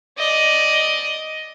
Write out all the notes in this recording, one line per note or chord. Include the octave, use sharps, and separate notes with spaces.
D5 D#5